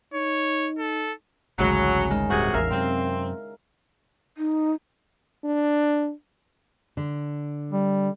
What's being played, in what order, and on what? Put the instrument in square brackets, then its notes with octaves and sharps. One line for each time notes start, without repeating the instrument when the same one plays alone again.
[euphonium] D#4 [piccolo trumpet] C#5
[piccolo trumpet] A4
[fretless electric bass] A1 D2 [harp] C#3 G#3 E4 [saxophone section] F#3
[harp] D#3 G#3
[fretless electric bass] D1 G2 [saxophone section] C3 F#4 G#4
[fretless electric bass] A1 E2 [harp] A#4 E5 F5
[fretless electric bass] F#2 C3 [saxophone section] C4
[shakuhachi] D#4
[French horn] D4
[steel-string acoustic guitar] D3
[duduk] G3